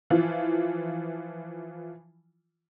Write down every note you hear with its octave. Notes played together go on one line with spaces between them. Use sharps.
E3 F3 F4